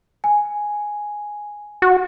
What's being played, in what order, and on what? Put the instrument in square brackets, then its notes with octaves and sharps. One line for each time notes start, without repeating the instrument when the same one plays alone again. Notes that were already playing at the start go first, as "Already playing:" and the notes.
[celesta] G#5
[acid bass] F#4